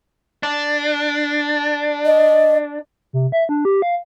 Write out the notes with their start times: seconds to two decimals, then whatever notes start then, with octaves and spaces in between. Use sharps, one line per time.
0.43 D4
2.05 D#5
3.13 C3
3.32 E5
3.49 D4
3.65 G4
3.82 F5